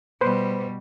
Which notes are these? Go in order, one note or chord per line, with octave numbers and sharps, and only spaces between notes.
B2 G3 B4 C5